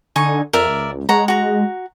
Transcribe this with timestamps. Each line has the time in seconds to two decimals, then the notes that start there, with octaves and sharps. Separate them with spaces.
0.16 D3 D#4 G#5 C#6
0.53 F2 A#4 D5 E5
0.68 C#2
1.09 G#3 C#5 F#5 A#5
1.28 F#4 A#5